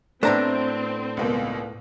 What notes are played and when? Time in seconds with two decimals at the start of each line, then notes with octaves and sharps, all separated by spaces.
0.23 A2 A3 B3 C4 D4 C5 A#5
1.17 C#2 B2 A#3